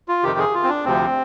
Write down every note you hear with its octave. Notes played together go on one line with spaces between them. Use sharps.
F4
F2 C3 D#3 G4
G#4
F4
C4
D4
D2 C3 F3 C4